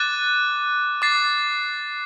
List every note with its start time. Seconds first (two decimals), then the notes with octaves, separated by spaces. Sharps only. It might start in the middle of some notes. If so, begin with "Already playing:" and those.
Already playing: D6 F#6 A6 D#7
1.02 D6 A6 C7